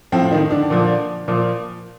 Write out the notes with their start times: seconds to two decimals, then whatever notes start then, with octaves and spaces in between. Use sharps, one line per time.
0.12 A2 F3 C4
0.31 D#3 D#4
0.51 D3 D4
0.70 A#2 F3
1.28 A#2 F3